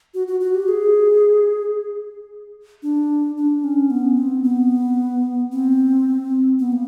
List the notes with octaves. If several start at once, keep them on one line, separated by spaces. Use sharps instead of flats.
F#4
F#4
F#4
G4
G#4
D4
D4
C#4
B3
C4
B3
C4
B3
A#3